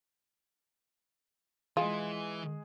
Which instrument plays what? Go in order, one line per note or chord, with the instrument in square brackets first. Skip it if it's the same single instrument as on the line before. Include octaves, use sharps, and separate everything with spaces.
[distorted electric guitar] E3 [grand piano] G#3 G#4 [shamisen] F4